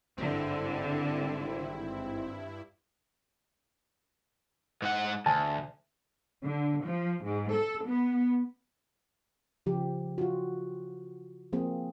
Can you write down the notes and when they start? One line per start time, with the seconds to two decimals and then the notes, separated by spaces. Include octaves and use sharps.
0.17 G#1 G2 D3 C4 E4
4.82 G#2 F#5
5.26 D2 G#5 A5
6.44 D3
6.85 F3
7.25 G#2
7.55 A4
7.88 B3
9.66 C#3 F3 G4
10.18 F4 F#4
11.52 F3 A#3 C4 G#4